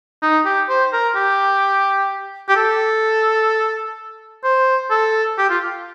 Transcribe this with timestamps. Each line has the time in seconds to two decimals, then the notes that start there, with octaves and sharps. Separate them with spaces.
0.22 D#4
0.45 G4
0.69 C5
0.93 A#4
1.16 G4
2.49 G4
2.56 A4
4.44 C5
4.91 A4
5.38 G4
5.50 F4